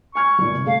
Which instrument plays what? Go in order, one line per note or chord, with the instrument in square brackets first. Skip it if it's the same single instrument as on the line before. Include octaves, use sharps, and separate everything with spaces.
[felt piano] G#5 F6 G#6 [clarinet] C#6
[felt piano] G1 A#2
C3
[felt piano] A3 [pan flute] F5